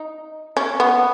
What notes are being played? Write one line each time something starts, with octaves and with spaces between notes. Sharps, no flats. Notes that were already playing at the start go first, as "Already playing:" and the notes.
Already playing: D#4
C#4
B3